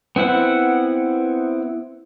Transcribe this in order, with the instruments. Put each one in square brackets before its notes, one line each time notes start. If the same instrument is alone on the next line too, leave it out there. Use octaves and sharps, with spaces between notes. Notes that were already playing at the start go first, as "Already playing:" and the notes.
[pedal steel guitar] B3 C4 E4 F#5